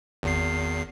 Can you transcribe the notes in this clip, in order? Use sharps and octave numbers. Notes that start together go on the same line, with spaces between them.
G#1 E2 C7